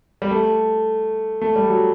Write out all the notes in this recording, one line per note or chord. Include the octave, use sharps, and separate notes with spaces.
G3
A3
A3
G3
F#3